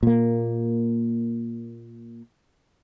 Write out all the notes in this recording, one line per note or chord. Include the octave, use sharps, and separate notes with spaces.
A#2 A#3